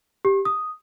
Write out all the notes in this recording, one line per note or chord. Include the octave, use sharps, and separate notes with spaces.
G4
D#6